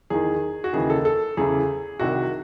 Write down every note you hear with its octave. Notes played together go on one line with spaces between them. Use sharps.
E2 D#3 G#4
F#4
D#2 C#3 E3 G#4
A4
A4
E2 C#3 E3 G#4
C2 C3 D#3 F#4